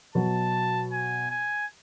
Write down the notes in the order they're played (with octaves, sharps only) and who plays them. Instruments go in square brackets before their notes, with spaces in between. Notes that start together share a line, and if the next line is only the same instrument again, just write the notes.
[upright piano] B2 F#3 B3 F#4 [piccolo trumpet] A5
[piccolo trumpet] G#5
G#5